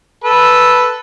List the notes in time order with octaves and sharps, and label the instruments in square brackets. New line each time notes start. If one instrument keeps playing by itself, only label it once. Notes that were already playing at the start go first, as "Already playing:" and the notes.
[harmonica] A4 B4